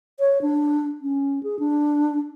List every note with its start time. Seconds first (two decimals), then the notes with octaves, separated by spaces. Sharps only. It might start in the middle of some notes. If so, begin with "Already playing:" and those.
0.20 C#5
0.42 D4
1.02 C#4
1.43 G#4
1.59 D4